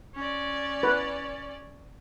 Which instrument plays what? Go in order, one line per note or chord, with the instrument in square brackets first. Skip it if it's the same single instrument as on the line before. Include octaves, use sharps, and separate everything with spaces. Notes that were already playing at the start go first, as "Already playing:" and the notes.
[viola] C#4 D5
[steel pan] B4